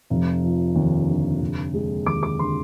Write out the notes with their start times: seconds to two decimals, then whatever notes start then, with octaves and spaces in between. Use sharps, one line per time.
0.10 F1
0.43 F3
0.75 D#2
1.09 D3
1.41 F1
1.74 G#3
2.06 D#2 D6
2.23 D6
2.39 D3 C6